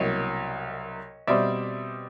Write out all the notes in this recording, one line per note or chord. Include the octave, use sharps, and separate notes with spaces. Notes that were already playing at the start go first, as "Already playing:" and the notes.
Already playing: C2 B2 F#3 A#3 C#5 D#5
B2 G3 C4 D5 E5